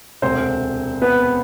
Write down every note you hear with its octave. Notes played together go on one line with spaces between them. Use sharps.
E1 D2 C3 C4 C5
B3 B4